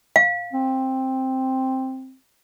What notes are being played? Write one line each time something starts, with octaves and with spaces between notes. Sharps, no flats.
F5
C4